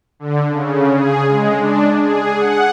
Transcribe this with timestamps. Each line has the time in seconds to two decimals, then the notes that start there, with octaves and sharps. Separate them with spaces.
0.19 D3
0.50 C#3
0.91 G#4
1.26 G#3
1.58 D4
2.01 G#4
2.35 F#5